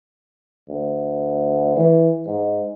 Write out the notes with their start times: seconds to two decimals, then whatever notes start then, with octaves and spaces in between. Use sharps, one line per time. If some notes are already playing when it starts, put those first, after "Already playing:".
0.70 D2
1.76 E3
2.27 G#2